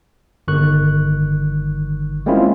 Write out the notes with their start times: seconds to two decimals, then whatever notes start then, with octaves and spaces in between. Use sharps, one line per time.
0.48 G1 D#3 C#6 F#6
2.26 G#3 A#3 C4 C#4 E4 F4